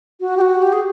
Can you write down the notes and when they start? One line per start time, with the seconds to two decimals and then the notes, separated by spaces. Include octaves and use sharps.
0.20 F#4
0.37 G4
0.41 F#4
0.62 G4
0.73 G#4